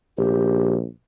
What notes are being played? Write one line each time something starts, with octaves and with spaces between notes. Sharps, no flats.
A#1 G4